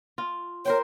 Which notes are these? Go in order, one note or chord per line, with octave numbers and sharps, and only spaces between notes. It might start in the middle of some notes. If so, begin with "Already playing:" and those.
F4
A#4 C5 C#5 G5